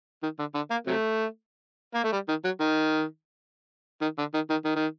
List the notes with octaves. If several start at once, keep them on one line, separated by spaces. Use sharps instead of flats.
D#3
D3
D3
A#3
C3 F#3 A3
A#3
A3
G3
D#3
F#3
D#3
D#3
D3
D#3
D#3
D#3
D#3